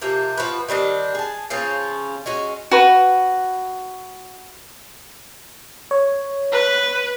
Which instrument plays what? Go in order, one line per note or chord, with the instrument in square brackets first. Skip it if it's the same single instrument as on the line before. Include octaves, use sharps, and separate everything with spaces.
[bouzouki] C3 F3 A#3
F3 F#4 B4
D#3 G3 C4 D4
G#4 A5
C#3 F3 C4 C#4
G#3 C#4 F#4
[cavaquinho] F#4 B4
[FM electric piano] C#5
[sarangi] B4